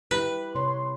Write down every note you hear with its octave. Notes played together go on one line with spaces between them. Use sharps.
G3 E4 G4 B4
C3 C#5 C6